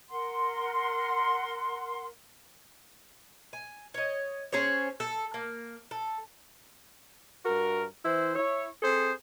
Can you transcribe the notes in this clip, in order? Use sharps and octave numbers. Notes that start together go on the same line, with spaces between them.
A#4 F#5 C6
G#5
C#5 D#5
C#4 G#4 C5 C#5
A4
A#3
A4
G2 F#4 A#4
E3 E4 C5
E4 C#5
C4 G#4 A4 C5